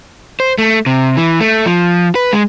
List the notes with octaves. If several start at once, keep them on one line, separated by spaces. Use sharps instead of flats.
C5
A3
C3
E3
A3
F3
B4
G#3